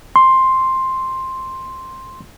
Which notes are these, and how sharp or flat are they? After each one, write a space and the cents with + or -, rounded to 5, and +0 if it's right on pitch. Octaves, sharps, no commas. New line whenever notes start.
C6 +5